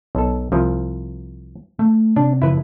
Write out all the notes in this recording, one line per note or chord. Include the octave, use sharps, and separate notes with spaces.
B1 A4
C2 F3
A3
C3 D4
F#1 C#3 F3 E4 B4